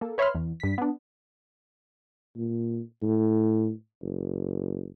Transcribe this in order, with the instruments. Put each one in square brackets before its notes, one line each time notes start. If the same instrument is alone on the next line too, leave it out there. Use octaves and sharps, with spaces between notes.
[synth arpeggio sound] A#3 A4
B4 C#5 E5 B5 C6 F6
E2
G2 B6
B3 D4
[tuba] A#2
A2
F#1